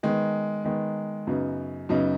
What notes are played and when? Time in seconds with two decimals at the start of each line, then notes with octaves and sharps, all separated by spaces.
0.03 D#3 G#3 B3
0.64 D#3 G#3 B3
1.27 F#2 C#3 F#3 B3 D#4
1.89 F#2 C#3 F#3 B3 D#4